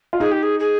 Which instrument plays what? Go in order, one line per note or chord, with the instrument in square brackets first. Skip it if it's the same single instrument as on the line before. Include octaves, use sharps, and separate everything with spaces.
[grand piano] F4
[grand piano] D#4 [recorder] G#4
[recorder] G4
G#4
G#4